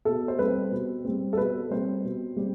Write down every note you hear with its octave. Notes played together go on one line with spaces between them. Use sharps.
B2 A4
C5
G3 C4 B4
B2
G3 C4
A4
B2 B4
G3 C4 C5
B2
G3 C4